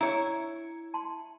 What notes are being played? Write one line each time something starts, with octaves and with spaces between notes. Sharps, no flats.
C#4 E4 C#5 A#5
A5 C6